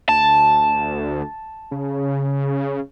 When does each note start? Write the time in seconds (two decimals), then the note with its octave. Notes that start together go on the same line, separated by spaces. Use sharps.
0.09 D2 A5
1.71 C#3